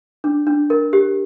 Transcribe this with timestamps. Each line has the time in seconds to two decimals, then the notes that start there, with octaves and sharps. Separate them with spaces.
0.24 D4
0.47 D4
0.70 A#4
0.93 G4